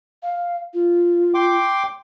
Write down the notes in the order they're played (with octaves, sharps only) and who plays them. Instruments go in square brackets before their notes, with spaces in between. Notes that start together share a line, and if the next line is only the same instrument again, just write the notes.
[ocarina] F5
F4
[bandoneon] G5 C6 D6